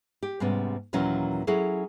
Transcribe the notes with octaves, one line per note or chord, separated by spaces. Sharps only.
G4
G#2 C3 G3 B3 C#4
D#2 A#2 E3 F#3 C#4
F#3 C#4 E4 G#4 A4